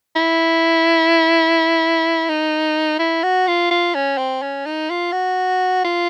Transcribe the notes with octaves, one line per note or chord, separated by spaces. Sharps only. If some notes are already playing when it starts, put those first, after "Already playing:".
E4
D#4
E4
F#4
F4
F4
C#4
C4
C#4
D#4
F4
F#4
F4